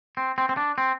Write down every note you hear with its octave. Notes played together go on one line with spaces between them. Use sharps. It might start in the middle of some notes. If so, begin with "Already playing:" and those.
C4
C4
C4
D4
C4